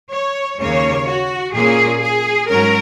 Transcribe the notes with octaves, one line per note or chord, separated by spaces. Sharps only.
C#5
D#2 C#3 A#3 C#4 C#5
F#4
A#2 A#3 C#4 G#4
G#4
G#2 F#3 C#4 A#4